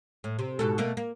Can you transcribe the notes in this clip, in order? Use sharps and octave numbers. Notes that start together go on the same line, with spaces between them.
A2
C3
G#2 B2 A4
B2 A3 A#3
A#3